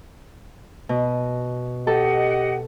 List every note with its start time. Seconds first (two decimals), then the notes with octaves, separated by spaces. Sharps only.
0.89 B2
1.87 G4 A4 D#5 F#5